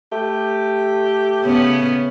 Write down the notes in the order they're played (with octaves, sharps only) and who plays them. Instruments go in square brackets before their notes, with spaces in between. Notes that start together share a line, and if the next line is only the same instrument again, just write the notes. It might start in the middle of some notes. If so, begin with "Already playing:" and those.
[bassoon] A3 [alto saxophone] G4
[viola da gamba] C#3 B3 C#4